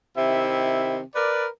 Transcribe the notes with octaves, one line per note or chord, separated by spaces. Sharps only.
C3 D#3 E4 E5
A#4 B4 D5